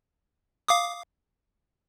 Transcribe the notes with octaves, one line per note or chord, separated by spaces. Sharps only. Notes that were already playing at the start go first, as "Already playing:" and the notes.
F5 D6 D#6